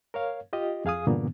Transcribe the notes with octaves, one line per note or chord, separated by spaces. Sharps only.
A#4 C#5 F5
F4 G4 D#5
F2 G#4 F5 G#5 D#6
G2 A#2 D3 E3 A#3 B3